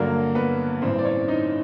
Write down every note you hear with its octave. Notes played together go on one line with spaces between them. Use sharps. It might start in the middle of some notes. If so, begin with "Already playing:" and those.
Already playing: G2 D3 F#3 A#3 A#4
B3 B4
A1 G2 E3 C4 C5
D5
C#4 C#5
D#4 D#5